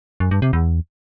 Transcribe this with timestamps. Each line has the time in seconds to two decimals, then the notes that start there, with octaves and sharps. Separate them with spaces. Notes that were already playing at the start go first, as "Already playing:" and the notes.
0.20 F#2
0.31 G2
0.42 C3
0.53 E2